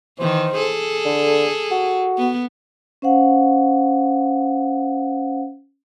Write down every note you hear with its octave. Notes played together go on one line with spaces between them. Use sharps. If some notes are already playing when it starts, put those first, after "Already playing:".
D#3 E3 C5
G#4 A4
D3
F#4
B3
C#4 C5 F5 F#5